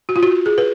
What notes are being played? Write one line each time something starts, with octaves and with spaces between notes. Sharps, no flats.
F#4
F4
F#4
G#4
B4